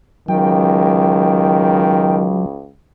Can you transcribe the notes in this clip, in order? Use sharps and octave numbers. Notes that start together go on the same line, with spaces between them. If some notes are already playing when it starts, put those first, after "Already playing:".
C#2 D#3 F#3 G5